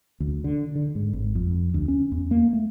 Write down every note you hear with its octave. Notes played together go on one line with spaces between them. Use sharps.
D2
D3
D3
G#2
G#1
F2
D2
C#4
E2
A#3
A3